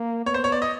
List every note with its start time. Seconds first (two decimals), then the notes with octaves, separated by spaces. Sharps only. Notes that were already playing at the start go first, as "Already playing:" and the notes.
Already playing: A#3
0.26 B3 C#5
0.34 C5
0.44 C#5
0.52 D5
0.62 D#5